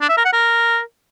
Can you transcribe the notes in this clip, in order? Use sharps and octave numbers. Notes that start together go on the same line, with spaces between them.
D4
E5
A#4
F#5
A#4